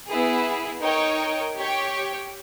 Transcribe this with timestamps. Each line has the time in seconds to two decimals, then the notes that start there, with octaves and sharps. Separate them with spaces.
0.08 B3 E4 G#4
0.81 D#4 A#4 C#5 G5
1.56 G4 C#5 G5